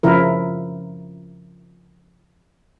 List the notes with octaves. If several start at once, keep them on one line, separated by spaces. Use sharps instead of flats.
C#3 F3 E4 A#4